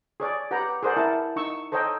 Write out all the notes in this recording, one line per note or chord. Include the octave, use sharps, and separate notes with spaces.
G#4 C#5 D5
G4 B4 F#5 G5 A#5
G#4 A#4 C5 D5 F#5
E4 A#4 A5
D#4 C#6 E6
A4 C5 C#5 D#5 G5 A#5